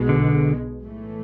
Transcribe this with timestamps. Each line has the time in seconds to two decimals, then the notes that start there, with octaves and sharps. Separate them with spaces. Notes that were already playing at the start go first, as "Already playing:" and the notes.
Already playing: B1 B2 G#3
0.09 D3
0.81 A2 E3 A3